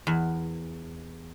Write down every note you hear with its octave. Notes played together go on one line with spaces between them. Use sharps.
E2